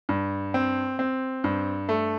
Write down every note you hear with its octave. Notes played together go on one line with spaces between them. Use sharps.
G2
C4
C4
G2
A3